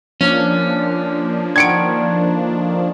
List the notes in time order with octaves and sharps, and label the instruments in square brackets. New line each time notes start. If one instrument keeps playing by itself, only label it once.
[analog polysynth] F3 A#3 D4 [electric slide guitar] C#4
[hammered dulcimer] D3 D#3 [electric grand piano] G#6 C#7 D7